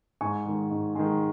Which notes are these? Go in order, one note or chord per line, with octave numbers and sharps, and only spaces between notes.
G#2 G#5 C#6
D#3 G#3
G#2
D#3 G#3